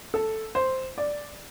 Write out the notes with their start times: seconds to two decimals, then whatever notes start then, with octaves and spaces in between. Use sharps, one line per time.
0.14 A4
0.55 C5
0.98 D5